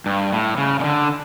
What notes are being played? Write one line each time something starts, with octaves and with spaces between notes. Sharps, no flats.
G2
A2
C#3
C#3
D3